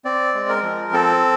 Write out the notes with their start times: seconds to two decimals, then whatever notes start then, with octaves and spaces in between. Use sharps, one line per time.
0.05 C4 D5
0.34 G#3
0.49 A#4
0.63 F3
0.93 C4 A4